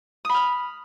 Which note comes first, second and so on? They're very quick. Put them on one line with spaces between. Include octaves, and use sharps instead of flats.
D#6 B5 F6